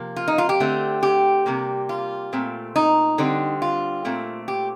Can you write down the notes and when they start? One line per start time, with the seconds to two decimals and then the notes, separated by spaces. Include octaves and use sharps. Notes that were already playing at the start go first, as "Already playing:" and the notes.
Already playing: C3 F3 A#3
0.16 F4
0.28 D#4
0.38 F4
0.49 G4
0.60 D3 A3 C4
1.03 G4
1.46 C3 G3 A#3
1.89 F4
2.33 A#2 A3 C4
2.76 D#4
3.18 D3 G3 C4
3.62 F4
4.05 A#2 A3 C4
4.48 G4